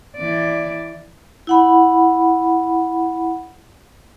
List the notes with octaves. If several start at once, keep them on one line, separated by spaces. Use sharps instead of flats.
E3 D5
E4 F#5 B5